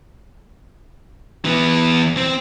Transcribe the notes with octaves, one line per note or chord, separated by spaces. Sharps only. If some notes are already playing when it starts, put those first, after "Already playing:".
E3 B3
C4